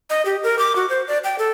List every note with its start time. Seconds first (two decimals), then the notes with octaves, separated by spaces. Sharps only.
0.10 D#5
0.25 G4
0.43 A#4
0.59 D6
0.76 F#4
0.89 C5
1.08 D5
1.24 G5
1.39 A4